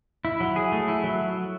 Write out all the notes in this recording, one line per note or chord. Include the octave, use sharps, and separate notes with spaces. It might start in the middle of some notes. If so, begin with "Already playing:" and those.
E4
F#3
G#4
A3
E4
F#3